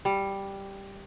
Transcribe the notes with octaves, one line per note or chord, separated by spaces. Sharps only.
G3